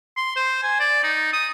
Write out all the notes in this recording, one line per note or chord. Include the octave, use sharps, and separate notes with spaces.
C6
C5
G#5
D5
D#4
D#6